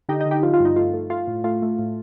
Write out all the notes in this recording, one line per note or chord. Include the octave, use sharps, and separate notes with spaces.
D3 D#4 G4
D#4 G4
D3
D#4 G4
F3 F4
F4
G2
D#4
A3 F4
A3
A3 F4
A2
A3 F4
A3
A2